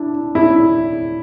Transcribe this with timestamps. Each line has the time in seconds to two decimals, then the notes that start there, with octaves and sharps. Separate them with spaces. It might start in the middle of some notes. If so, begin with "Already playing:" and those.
Already playing: D4 E4
0.35 E4